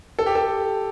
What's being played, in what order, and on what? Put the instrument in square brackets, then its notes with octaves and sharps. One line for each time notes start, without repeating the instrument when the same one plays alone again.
[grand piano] A4
G4
A4